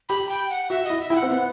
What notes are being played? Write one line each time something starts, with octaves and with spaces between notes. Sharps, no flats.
G4 B5
G5
F#5
F#4 E5
D#5
E4
E5
E4 G5
F#5
C4
B3 F#5